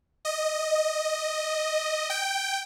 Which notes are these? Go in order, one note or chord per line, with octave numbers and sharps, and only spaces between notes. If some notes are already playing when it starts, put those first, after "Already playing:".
D#5
G5